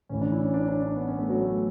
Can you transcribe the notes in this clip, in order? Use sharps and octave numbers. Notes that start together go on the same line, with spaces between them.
A1 A2 E3 C#4
D4
E4
C#4
D4
D4
D4
B3
C#4
A3
F#3
A3